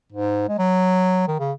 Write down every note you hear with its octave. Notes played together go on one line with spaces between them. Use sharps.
G#2
G#3
F#3
D#3
C#3